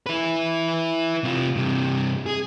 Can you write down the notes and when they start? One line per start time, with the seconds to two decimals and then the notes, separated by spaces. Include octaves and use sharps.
0.06 E4 B4
1.24 C3 F4
1.56 G2 C3
2.26 G#4